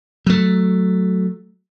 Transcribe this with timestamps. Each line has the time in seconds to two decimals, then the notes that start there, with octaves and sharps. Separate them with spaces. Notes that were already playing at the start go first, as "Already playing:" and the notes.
0.26 F#3 A3